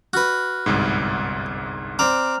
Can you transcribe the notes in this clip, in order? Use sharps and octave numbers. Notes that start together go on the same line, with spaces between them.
F#4 B4 F6 F#6
G1 C2 G#2
C4 D5 A#5 F6 F7